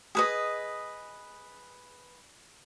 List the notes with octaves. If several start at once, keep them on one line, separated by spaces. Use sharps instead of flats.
G#4 B4 D#5